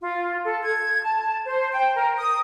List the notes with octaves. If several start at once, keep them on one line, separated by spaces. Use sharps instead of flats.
F4
A4
G#6
A5
C5
G5
A#4
D#6